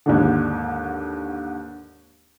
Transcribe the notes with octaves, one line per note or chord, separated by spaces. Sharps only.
D#2 G#2 D3